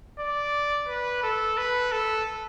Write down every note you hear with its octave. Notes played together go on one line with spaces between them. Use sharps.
D5
B4
A4
B4
A4